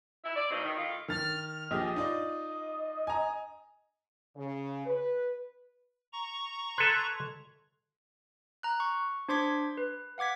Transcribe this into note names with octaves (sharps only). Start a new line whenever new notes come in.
E4
D5
B2 F#3 A#3 C4 D#4
D#3
A2 D#3 F4
D#3 F6 A6
A#1 G4 G#4 D#5
D#4 F4 D5
G#5 A#5
C#3
B4
A#5 C#6
A4 B4 C6 F#6 G#6
A#5 F#6
C#6
D4 C5 C6 D6 G#6 B6
B4
F5 F#5 D6 G#6 B6